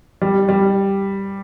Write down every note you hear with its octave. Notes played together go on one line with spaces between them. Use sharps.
G3
G3